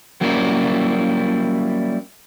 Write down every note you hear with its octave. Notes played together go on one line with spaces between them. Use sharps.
F#3 G3 A#3 C#4 E4